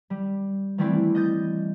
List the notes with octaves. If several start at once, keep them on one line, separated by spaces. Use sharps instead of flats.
G3
E3 G3 A3 C4 D4 E4
D#5 G6 A6